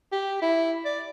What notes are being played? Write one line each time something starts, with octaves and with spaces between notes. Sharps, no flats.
G4
E4
D5